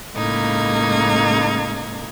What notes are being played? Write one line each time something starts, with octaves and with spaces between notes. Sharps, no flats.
A2 C#3 G#3 A#3 D#4 G#6